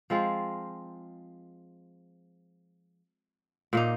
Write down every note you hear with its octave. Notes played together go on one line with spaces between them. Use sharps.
F3 G#3 C4 F4
A#2 A#3 D#4